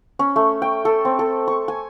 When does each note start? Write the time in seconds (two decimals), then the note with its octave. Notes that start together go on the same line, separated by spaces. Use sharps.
0.19 C#4
0.36 A3
0.62 G5
0.85 A4
1.05 C4
1.19 A4
1.48 C#6
1.68 G#5